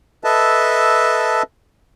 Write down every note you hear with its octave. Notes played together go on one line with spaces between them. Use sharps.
A4 B4 D#5 E5 A5